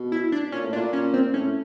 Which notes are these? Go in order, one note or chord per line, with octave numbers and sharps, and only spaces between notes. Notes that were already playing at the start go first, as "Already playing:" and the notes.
Already playing: B2
E4
D4
A#2 C#4
A2
A#2 D4
C#4
C4
A2 C#4